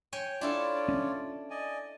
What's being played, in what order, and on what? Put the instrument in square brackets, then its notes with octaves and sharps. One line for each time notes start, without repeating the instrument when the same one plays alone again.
[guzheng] C#5 G5 G#5
[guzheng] D4 E4 A4 [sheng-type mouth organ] F4 C#5 D5
[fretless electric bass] C#4
[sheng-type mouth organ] D5 D#5 G#5